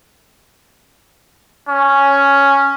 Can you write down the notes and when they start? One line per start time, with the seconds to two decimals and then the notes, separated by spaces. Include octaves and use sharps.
1.68 C#4